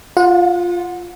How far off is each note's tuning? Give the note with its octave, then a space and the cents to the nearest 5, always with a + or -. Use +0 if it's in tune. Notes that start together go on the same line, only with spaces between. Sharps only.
F4 +0 F#5 -35